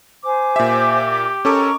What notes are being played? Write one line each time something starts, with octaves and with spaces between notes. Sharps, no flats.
C5 G#5 D6
A#2 G4 E5
C#4 A4 A#4 D#5 A#5 C#6 D6